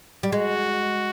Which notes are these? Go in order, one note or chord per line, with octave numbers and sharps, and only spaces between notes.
G3
G#3 F#4